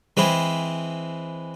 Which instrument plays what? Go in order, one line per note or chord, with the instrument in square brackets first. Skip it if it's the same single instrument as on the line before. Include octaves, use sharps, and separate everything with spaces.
[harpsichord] E3 G#3 C4 E4